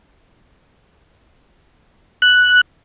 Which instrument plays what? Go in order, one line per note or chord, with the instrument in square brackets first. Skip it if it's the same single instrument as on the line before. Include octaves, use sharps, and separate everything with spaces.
[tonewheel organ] F#6